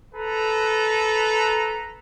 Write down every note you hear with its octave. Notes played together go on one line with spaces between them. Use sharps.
A4 B4 A#5